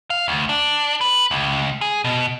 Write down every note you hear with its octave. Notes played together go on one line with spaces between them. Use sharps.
F5
D2
D4
B4
C#2
G#4
B2